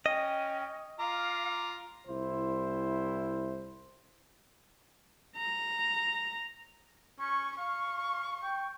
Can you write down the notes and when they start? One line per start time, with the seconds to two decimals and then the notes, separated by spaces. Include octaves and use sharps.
0.06 C#4 D#5 G5
1.00 F4 F5 A#5 D6
2.07 C2 E4 C5
5.37 A#5
7.20 C#4 C#6
7.58 F5 C#6
8.43 G5